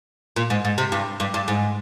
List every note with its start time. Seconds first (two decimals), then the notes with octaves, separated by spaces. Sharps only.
0.36 A#2
0.50 G#2
0.65 G#2
0.78 C3
0.92 G2
1.20 G2
1.34 G2
1.48 G#2